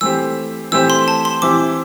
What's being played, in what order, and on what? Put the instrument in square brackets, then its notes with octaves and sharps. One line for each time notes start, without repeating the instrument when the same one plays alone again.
[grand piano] E3 A3 C4 G4 C5 [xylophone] E6
[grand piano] E3 A3 C4 G4 C5 [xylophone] E6
[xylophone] C6
A5
C6
[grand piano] E3 C4 E4 G4 [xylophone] D6